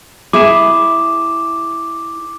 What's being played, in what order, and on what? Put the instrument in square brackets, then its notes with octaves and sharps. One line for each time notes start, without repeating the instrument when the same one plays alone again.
[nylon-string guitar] E4 G#4 [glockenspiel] D6 E7